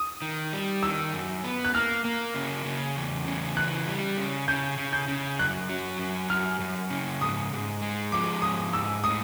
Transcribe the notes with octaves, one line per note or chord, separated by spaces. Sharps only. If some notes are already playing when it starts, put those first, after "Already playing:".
Already playing: D#6
D#3
G3
D#3 E6
F#2
B3
F#6
A#3 F6
A#3
C#3
C#3
E2
C#3
E3 F#6
G3
C#3
C#3 G6
C#3
G6
C#3
F#2 F#6
F#3
F#2
F#2 F6
F#2
C#3
G#2 D#6
G#2
G#3
F3 D6
G#2 D#6
G#2 E6
A2 D#6